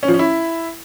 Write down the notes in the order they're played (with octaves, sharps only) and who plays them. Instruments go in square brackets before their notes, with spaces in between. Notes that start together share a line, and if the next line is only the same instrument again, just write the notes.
[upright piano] C#4
F3
C#4
E4